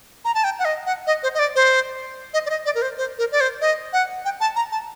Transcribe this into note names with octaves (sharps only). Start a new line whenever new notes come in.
A#5
A5
G5
F#5
D#5
F#5
D#5
C5
D#5
D5
C5
D#5
D5
D#5
D5
A#4
C5
C5
A#4
D5
C5
D#5
F#5
G5
A5
A#5
A5